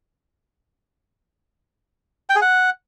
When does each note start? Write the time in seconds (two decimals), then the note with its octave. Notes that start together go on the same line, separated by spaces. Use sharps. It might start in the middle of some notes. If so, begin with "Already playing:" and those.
2.30 G5
2.36 G#4
2.42 F#5